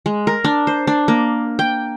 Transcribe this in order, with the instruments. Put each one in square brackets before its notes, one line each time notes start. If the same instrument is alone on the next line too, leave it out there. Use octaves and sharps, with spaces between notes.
[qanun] G#3
A#4
D4
C5
D4
A#3
G5